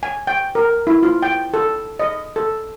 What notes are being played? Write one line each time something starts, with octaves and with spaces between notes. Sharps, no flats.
G#5
G5
A#4
E4
F4
G5
A4
D#5
A4